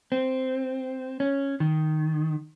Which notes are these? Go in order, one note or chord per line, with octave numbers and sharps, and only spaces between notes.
C4
C#4
D#3